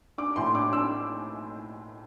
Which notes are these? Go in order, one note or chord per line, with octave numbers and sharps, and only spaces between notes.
D4 D6
A2 C6
D4 D6
D4 E6